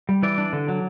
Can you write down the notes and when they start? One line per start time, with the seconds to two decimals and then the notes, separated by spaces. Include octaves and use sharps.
0.09 G3
0.23 E3 D5
0.38 D4
0.53 D3
0.69 F#3